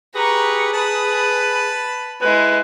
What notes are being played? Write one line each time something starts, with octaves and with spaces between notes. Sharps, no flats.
G4 G#4 B4 A#5 C#6
B4 A5 B5
G#3 E4 B4